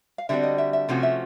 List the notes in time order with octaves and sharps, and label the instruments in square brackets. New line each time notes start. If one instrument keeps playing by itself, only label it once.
[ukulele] F5
[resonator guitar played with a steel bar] D3 G3 C4 D#4 F#4 [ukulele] E5
[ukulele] D#5
E5
E5
[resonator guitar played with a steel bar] C3 F3 A3 C#4 F#4
[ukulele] E5